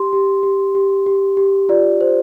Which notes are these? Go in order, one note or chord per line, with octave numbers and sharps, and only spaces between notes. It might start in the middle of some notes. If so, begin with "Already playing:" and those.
Already playing: G4 C6
G4
G4
G4
G4
G4
F4 D5
C5